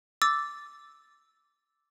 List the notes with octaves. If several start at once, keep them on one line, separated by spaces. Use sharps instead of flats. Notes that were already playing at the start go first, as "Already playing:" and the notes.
D6 E6 A6